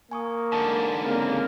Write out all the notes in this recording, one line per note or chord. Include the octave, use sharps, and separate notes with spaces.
A#3 G#5 C#6 D#6
G#2 D3 A5
C#3 A#3 C4